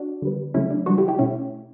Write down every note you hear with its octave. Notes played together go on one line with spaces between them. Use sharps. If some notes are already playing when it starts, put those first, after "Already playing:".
Already playing: D4 F#4
D3 G3 B3
C#3 F#3 A3 C#4 E4
D4
C#3 E3 G3 D4 F#4
E4 G4
E4 G4
B2 A3 C#4 E4